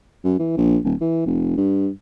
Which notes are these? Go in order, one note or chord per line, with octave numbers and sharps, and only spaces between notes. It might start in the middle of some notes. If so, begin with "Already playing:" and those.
F#2
E3
A#1
D#1
E3
F1
G2